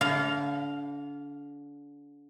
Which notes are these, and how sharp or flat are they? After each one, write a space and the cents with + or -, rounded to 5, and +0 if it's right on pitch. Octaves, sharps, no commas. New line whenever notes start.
D3 -35 F5 +0